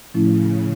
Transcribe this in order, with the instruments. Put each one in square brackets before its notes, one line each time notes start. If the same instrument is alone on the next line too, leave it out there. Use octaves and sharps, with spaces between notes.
[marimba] A2 F3 A3 C#4 E4 [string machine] C#3